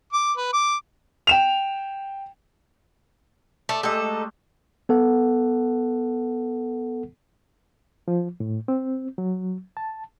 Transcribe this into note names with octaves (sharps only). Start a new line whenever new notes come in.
D6
B4
D6
G5 E7 F7
A3 D5
G#3 A3 D#4 G4 A4
B3 A4 F#5
F3
A2
C4
F#3
A5